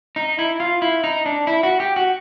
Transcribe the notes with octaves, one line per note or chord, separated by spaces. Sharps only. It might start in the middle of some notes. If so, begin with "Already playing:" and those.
D#4
E4
F4
E4
D#4
D4
E4
F#4
G4
F#4